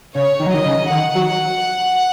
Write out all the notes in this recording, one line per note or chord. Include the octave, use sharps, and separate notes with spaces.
C#3 C#5
D#3
F#3
D#3 D#5
C#3
D#3 F#5
F#3